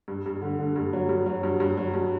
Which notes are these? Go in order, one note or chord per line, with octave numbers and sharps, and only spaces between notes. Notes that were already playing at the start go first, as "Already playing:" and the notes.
G2
G2
D3
D3
G2
F#3
G2
F#3
G2
G2
F#3
G2